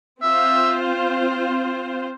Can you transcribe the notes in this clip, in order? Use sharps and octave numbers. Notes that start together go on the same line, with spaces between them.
C4 F4 C5 E5